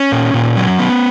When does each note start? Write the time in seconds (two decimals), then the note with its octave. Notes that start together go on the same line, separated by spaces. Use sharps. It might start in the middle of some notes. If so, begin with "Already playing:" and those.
Already playing: C#4
0.12 A#2
0.34 A#2
0.56 F#3
0.79 B3